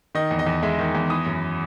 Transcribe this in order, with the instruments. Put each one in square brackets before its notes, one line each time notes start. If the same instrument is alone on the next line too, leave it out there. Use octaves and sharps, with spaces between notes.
[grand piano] D#3 D#5
E2
D#5
E2
G#3 E5
D#3
E2
E3 D#6
F#2